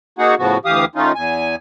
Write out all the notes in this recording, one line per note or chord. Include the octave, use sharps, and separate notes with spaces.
A#3 D#4 F#4 G#4 F#5
A2 C#3 F3 B3 F#4
D2 E3 G4 F5 D#6
D#3 A3 C#4 D#4 F4
E2 G#5